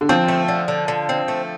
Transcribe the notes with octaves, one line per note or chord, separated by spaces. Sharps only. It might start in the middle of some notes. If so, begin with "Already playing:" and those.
D3
F3 C4
A3
D3
D3
D3
C4
A3